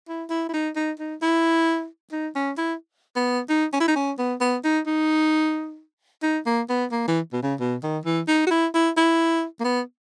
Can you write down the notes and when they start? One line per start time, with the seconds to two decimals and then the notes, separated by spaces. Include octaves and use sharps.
0.08 E4
0.30 E4
0.49 E4
0.53 D#4
0.75 D#4
0.99 D#4
1.22 E4
2.12 D#4
2.35 C#4
2.58 E4
3.16 B3
3.49 D#4
3.73 C#4
3.80 E4
3.88 D#4
3.96 C#4
4.18 B3
4.40 B3
4.64 D#4
4.86 D#4
6.22 D#4
6.46 A#3
6.69 B3
6.91 A#3
7.08 E3
7.33 B2
7.42 C#3
7.60 B2
7.83 D#3
8.05 E3
8.28 D#4
8.47 F#4
8.50 E4
8.74 E4
8.97 E4
9.60 A#3
9.64 B3